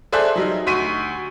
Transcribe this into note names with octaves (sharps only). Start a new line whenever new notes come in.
G#4 A4 C5 D5 E5 F#6
F#3 G3 D#4
D2 F#4 C6 C#6 B6 D#7